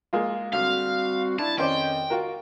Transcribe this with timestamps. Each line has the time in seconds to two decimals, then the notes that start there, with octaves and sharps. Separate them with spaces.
0.13 G#3 A#3 F4
0.53 D2 G3 C4 F#4 F5
1.39 D4 E4 A5
1.58 F2 D#3 C#4 C5 D5 D#5 G5
2.10 F4 F#4 A#4